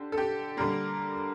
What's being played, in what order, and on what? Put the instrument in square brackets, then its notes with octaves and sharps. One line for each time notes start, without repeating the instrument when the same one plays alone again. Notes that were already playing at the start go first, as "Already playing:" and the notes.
Already playing: [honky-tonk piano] D3 G4
A4
G4
D3 G3 A#3 A#4